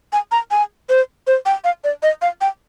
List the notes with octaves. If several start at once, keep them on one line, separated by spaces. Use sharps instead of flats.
G#5
A#5
G#5
C5
C5
G5
F5
D5
D#5
F5
G5